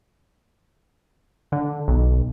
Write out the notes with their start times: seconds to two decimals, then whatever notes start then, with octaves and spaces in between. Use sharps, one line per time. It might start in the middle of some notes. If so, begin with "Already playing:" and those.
1.52 D3
1.88 B1